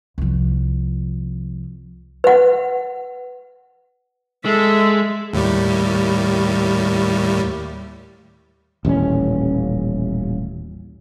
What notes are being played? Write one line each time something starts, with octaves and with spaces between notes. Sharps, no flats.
C2 F3
B4 F#5
G#3 A4 E5
D#2 A2 G3
D#1 A1 C4 C#4